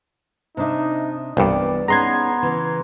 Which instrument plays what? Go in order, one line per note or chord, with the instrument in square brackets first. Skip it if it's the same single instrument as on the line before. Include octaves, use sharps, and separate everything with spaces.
[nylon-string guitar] C3 D4 E5 [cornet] D#4
[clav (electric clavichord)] C2 G2 [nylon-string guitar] E3 B3 [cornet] D5
[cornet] B3 [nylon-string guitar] C#4 D#4 G#4 [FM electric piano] A#5 C6 G#6
[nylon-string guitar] C#3 E3